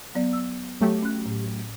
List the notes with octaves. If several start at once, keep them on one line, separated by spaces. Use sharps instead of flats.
F#3 B3 D5
E6
F#3 A3 G4
C#4 F#6
A2